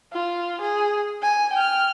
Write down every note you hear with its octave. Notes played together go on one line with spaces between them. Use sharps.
F4
G#4
G#5
G5 F6